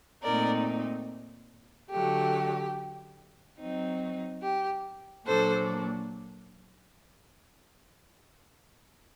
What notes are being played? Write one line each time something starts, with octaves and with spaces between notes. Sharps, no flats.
A#2 A3 C4 D#4 A#4 D5
D3 F#3 A3 G4
F#3 C4 D#4
G4
A#2 F#3 A#3 D4 A4 C5